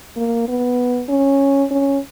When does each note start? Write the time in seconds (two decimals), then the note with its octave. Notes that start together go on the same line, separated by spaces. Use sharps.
0.17 A#3
0.48 B3
1.09 C#4
1.71 C#4